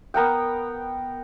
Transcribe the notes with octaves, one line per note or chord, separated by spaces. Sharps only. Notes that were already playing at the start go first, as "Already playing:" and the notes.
B3 A#4 F#5 G5